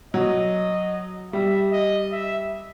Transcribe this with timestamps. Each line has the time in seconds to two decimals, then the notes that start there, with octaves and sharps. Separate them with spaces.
0.14 F#3 D#5
1.33 G3 E5
1.72 D#5
2.12 E5